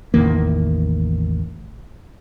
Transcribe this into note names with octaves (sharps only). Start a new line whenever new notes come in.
A1 E2 D#3 A#3